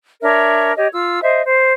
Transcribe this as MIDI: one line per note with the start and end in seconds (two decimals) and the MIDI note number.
0.21 0.72 62
0.21 0.72 70
0.21 0.72 73
0.21 0.72 76
0.77 0.88 67
0.77 0.88 73
0.77 0.88 75
0.93 1.21 65
0.93 1.21 88
1.21 1.42 72
1.21 1.42 75
1.21 1.42 76
1.44 1.74 72